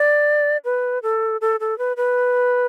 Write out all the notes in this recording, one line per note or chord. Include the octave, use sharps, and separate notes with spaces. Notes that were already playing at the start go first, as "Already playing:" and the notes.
Already playing: D5
B4
A4
A4
A4
B4
B4